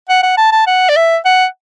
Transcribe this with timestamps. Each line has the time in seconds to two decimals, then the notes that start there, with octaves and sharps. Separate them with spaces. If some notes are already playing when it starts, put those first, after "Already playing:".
0.09 F#5
0.23 F#5
0.37 A5
0.52 A5
0.67 F#5
0.89 D5
0.97 E5
1.25 F#5